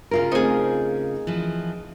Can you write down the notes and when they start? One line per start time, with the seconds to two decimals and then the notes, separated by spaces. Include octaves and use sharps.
0.11 C#3 F4 A#4
0.32 A3 C4 D#4 G#4 C5
1.27 E3 F3